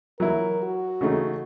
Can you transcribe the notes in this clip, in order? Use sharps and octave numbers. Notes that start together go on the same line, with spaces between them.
F#3 E4 A#4
F#4
C#3 A3 D#4